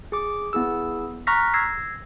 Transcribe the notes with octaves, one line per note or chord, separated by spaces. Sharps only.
G#4 D6
B3 E4 G#4 E6
A#5 C#6 F6 F#6 A#6 B6
E6 G#6 A#6 C7